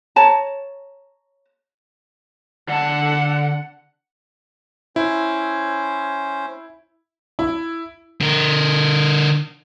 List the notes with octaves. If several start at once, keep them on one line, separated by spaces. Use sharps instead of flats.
C#5 A5 A#5
D3 F#5 A5
C#4 E4 C5
E4
D3 A#4